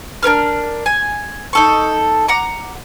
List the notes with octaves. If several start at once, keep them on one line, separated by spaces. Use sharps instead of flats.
D4 A#4 B4 F6
G#5
D#4 A4 C#6
F#5 A#5 D6